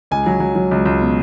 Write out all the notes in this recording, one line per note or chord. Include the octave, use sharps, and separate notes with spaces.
C#2 G#5
F#3
F#3
F#3
C#2
C#2
B2